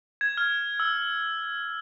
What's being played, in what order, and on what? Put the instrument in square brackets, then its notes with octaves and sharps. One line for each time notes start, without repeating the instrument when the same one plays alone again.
[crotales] G#6
F6
E6